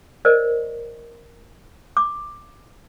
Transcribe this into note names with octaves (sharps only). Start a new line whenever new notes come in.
A#4 C5 D5 D#5
D6